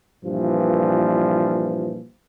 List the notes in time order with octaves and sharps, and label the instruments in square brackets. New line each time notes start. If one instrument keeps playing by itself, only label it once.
[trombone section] G2 A#2 E3 F3